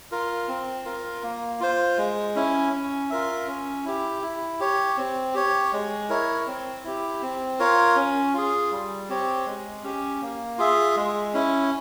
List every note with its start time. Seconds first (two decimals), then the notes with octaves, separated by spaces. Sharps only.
0.11 F4 A#4
0.48 C4
0.85 F4 A#4
1.23 A#3
1.60 F4 C5
1.98 G#3
2.35 C#4 E4
2.72 C#4
3.10 F4 A#4 E5
3.47 C#4
3.85 E4 G4
4.22 E4
4.60 G4 C#5
4.97 C4
5.34 G4 C#5
5.73 G#3
6.09 E4 A#4 C#5
6.47 C4
6.84 E4 G4
7.22 C4
7.60 F4 A#4 C#5
7.96 C#4
8.34 F4 G#4
8.71 G3
9.09 C4 G4 C#5
9.46 G#3
9.84 C#4 G4
10.22 A#3
10.58 F4 G#4 E5
10.96 G#3
11.34 C#4 E4